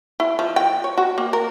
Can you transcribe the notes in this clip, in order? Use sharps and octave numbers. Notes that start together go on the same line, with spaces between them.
E4
F3
G5
C#5
F#4
A#3
A#4